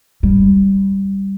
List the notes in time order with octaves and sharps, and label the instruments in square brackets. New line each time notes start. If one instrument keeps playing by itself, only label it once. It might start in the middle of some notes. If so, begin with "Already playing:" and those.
[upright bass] G3